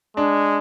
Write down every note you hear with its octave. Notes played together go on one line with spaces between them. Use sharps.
G#3 D4